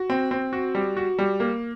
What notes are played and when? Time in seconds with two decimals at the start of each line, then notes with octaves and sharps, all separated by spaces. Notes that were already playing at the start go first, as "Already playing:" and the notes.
Already playing: F#4
0.10 C4
0.31 C4
0.53 F#4
0.75 G3
0.97 F#4
1.19 G3
1.40 A#3